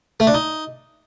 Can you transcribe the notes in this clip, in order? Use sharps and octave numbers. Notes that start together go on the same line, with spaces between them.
A3
D4
D#4